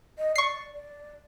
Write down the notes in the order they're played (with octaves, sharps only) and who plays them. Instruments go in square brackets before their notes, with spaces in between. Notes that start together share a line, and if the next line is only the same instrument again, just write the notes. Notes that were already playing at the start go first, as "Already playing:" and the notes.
[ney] D#5
[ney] D5 [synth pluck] C#6 C7
[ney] D5